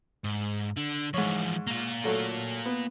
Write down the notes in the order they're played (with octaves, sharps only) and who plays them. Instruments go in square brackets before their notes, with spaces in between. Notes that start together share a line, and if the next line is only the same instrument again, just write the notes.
[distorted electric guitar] G#2
D3
[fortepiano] G#2 C#5 [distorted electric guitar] E3 F3
[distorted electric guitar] A#3 F4
[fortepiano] D3 F#3 A3
B3